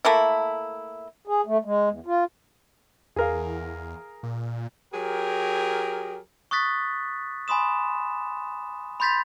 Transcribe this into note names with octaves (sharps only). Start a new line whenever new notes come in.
A3 A#3 E4
G#4
A3
G#3
E2
F4
E2 G#4 A#4 F5
A#2
F#3 G4 G#4 A#4
C#6 D#6 F#6 A6 B6
G#5 B5 C6 D#6 E7
B5 C6 G6 A6 B6 F7